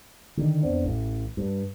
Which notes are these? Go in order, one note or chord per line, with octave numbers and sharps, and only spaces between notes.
D3 D#3
F2 B3 C4 D4
A1
G2